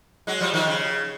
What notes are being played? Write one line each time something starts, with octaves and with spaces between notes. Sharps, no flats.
F#3 G#3
F3 G3
D#3 F3
C#3